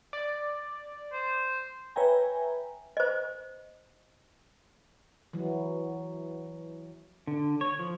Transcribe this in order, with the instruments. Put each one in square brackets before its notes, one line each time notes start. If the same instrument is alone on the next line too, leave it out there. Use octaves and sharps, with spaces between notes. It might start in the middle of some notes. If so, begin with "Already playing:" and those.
[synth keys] D5
[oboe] C5
[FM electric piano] B4 C#5 E5 G5 G#5 A#5
[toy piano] C5 D#5
[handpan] E3 F#3
[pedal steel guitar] D3
C#5
F3